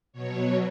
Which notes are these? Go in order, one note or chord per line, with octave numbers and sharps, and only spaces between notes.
B2 F#3 C#5